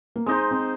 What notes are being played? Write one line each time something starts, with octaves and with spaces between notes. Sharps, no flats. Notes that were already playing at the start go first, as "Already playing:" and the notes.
A#3
G#3 C4 D#4 C5 D#5
C4